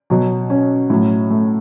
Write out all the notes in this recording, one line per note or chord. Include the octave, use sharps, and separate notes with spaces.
B2 F#3
C#4
A2 F#3
A3